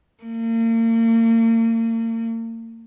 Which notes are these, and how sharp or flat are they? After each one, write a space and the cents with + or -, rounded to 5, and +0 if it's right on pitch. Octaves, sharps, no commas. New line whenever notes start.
A#3 -40